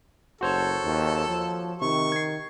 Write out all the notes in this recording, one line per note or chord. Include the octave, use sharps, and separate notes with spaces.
F#1 F#4 A4 C5 C#5
D#2
F3
C3 D#3 C#6
G#6 C7